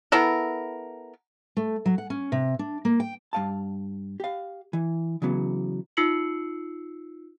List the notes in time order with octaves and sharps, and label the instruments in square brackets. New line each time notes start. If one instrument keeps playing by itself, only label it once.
[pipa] B3 E4 A4 A#4
[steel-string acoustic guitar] A3
F#3
F#5
C#4
C3
D4
A#3
G5
[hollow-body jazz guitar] G2 F5 A5
G4 F5
E3
C#3 E3 F#3 B3
[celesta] D#4 F4 E6 C7 C#7 F#7